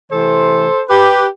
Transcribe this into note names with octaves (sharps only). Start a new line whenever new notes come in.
C3 E3 A3 A4 C5
G4 B4